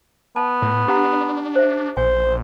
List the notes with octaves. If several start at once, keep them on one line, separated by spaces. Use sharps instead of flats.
B3 A5
A2
D4 G4 F#5 A#5
C5 E5
A#1 C5 G#5